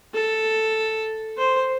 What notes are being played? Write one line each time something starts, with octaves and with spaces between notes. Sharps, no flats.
A4
C5